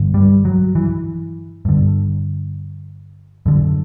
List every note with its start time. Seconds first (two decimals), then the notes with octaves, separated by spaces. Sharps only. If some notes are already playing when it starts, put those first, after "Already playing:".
Already playing: G2 D3
0.14 G3
0.45 F#3
0.75 E3
1.65 G2 D3
3.46 F#2 D3